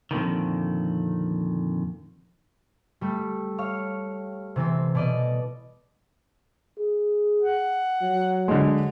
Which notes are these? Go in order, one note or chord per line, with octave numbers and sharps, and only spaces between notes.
F2 A#2 D3 D#3
G3 A3
C#5 F5
C3 E3 C4
B2 D5 D#5
G#4
F#5
F#3
D3 G#3